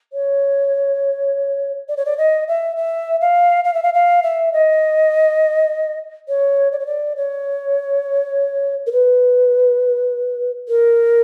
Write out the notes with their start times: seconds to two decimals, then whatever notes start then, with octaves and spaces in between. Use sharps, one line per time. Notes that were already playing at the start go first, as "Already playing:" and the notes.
0.13 C#5
1.88 D5
1.97 C#5
2.05 D5
2.17 D#5
2.48 E5
2.76 E5
3.21 F5
3.64 F5
3.74 E5
3.83 F5
3.94 F5
4.23 E5
4.53 D#5
6.28 C#5
6.72 D5
6.79 C#5
6.86 D5
7.16 C#5
8.86 A#4
8.92 B4
10.68 A#4